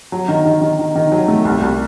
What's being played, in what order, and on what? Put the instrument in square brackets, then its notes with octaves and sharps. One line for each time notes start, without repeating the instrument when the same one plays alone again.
[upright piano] F#3
D#3
D#3
D#3
D#3
D#3
F#3
A3
C2
C2